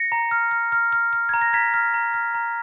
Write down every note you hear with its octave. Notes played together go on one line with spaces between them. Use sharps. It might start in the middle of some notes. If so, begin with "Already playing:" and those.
Already playing: A#6 C#7
A#5
F6
F6
F6
F6
F6
A#5 G#6
A#6
A#5 G#6 B6
F6
A#5
F6
A#5